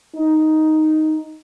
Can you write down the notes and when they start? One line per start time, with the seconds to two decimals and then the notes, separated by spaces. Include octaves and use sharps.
0.16 D#4